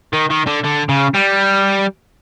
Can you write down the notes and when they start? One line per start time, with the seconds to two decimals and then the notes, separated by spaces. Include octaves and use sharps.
0.13 D#3
0.30 D#3
0.47 D3
0.64 D3
0.89 C#3
1.15 G3